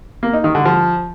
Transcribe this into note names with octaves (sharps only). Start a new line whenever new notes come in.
A#3
D#4
D#3
D3
F3